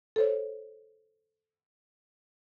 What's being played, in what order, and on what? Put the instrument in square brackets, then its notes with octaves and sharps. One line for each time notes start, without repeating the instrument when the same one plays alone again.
[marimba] A4 C5 C#5